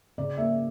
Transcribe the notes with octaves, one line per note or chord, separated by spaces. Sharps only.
C#3 D5
A#3 E5